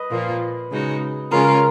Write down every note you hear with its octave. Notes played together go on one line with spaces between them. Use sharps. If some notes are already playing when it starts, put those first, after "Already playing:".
Already playing: B4 D#5
A#2 F3 A#3 F4
C#3 G#3 D#4 F#4
C#3 G#3 C#4 F4 A#4